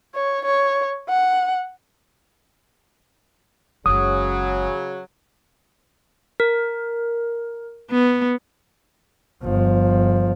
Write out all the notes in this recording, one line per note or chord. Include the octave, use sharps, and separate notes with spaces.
C#5
C#5
F#5
F#1 C#3 F#3 G#3 D#6
A#4
B3
G1 F3